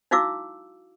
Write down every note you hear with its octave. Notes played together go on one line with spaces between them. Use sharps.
D#4 E4 F#4 F5 D6 E6